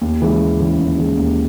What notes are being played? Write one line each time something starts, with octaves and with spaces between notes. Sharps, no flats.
D#2
C#3 E3 G#3
D#2
C#3 E3 G#3
D#2
C#3 E3 G#3
D#2